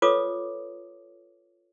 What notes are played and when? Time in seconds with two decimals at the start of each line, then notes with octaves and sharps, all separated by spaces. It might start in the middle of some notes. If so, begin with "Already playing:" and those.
0.02 F4 A4 B4 C#5 D6 D#6